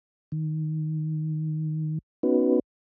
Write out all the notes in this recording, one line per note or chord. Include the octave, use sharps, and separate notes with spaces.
D#3
B3 C#4 D#4 F#4 B4